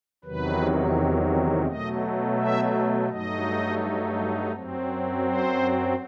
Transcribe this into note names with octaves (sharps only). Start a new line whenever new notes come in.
E2 C3 D#3 F#3 B4
B2 F#3 A3 D#5
E5
G2 F#3 A3 D#4 D#5
F#2 F#3 C4
C5